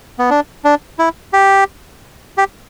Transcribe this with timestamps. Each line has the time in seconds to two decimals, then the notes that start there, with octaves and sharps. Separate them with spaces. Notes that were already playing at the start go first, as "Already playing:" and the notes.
0.19 B3
0.30 D4
0.64 D4
0.99 E4
1.33 G4
2.37 G4